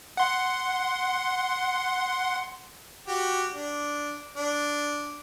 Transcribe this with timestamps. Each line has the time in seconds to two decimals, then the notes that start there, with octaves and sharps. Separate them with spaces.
0.17 F#5 C6
3.08 F#4 G4
3.54 D4
4.36 D4